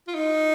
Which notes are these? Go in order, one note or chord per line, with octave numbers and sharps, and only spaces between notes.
F4
D#4